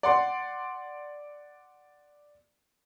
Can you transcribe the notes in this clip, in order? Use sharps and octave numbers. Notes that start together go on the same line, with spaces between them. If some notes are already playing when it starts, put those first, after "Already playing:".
D5 F#5 C6